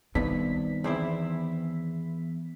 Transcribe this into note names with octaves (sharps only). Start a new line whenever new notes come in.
C2 G2 D#3 B3 B6
E2 C4 E4